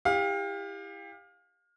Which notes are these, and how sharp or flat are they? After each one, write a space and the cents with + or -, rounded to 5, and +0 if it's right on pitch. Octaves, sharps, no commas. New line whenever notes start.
E4 +0 G4 +30 F5 +25